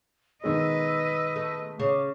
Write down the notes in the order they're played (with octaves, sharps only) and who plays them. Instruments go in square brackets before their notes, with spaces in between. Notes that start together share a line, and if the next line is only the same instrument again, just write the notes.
[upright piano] B2 D#3 G#3 [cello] B4 D#5 [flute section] E6
[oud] A3
[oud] C#3 [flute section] D6